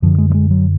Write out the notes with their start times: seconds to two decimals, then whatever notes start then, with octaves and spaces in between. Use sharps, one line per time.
0.02 F#2 D3 F3
0.18 G#3
0.30 F#3
0.34 G#3
0.51 F#3